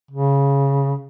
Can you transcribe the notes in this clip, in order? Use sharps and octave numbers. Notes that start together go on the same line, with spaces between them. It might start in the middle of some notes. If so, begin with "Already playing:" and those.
C#3